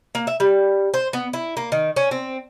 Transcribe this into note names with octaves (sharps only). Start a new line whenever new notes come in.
A#3
E5
G3
C5
B3
E4
A#3
D#3
C#4
C4